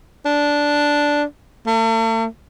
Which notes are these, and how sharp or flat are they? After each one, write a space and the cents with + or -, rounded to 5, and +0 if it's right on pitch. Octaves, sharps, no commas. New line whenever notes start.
D4 -5
A3 +45